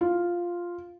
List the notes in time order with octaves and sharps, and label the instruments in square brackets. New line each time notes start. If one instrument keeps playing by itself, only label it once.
[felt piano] F4